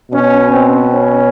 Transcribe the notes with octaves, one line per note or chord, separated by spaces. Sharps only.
B2 C#4
C4
C#4